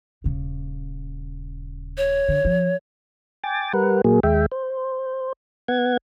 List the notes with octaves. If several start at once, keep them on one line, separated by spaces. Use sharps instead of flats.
D#1 C#3
C#5
D3
F3
G5 G#5 D6 A6
G3 A#4 B4 F#5
A#2 F#3 A#3 G#4
D#2 G#3 E5 G5
C5
B3 F#5 G#6